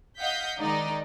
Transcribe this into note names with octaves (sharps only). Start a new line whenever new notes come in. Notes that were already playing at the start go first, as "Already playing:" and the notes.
D#5 F5 F#5 G6 B6
D#3 G#3 D#4 D5